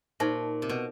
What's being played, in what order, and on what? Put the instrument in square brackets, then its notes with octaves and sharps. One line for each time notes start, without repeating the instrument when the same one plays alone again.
[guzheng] A#2 [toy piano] D#4 G4 C5 E5 A5
[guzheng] C3
B2